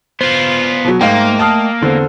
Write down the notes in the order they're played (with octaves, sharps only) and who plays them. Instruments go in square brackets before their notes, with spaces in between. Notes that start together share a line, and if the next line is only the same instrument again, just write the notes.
[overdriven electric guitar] B3 F4 [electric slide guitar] C5
[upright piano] B2 F#3
[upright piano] G#2 F5 [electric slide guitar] A3 D#5 G5 [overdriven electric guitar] A#3
[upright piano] A5 D#6 F6
E2 D3 C4